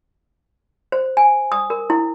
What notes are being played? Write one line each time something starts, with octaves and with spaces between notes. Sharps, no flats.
C5
G#5
D#6
A#4
E4